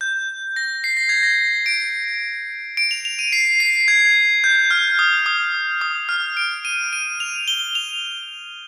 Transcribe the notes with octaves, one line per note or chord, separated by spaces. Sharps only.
G6
A#6
C7
A#6
G#6
A#6
D7
D7
F7
F7
D#7
C7
C7
G#6
G6
F6
D#6
D#6
D#6
F6
D7
D#7
D#7
F7
G7
F7